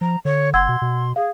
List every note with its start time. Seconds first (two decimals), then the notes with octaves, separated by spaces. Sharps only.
0.01 F3 A#5
0.25 D3 C#5
0.54 F#1 F#5 C6 E6 G#6
0.69 B2
0.82 B2
1.16 G#4 F5